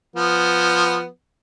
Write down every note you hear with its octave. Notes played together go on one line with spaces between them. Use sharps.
F3 B3